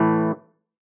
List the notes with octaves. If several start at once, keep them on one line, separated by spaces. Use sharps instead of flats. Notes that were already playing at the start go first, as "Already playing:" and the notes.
Already playing: A2 E3 A3